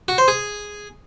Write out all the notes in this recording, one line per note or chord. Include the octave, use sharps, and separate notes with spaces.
F#4
C5
G#4